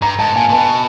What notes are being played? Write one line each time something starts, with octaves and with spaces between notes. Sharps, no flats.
G2 A#5
G#2 A5
A2
A#2 G#5
A#2
B2 A5